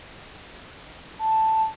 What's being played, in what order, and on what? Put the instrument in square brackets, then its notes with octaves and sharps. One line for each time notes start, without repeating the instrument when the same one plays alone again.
[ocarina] A5